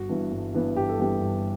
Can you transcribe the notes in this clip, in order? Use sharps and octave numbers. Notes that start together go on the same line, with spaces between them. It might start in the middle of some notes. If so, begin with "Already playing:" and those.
Already playing: G1 F#4
G2 E3 B3
G1
G2 E3 B3
G1 G4
A4
G2 E3 B3 G4
G1